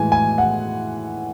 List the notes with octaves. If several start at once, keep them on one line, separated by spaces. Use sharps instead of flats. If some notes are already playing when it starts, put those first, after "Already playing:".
Already playing: A2 E3 G#3 G#5
G#5
F#5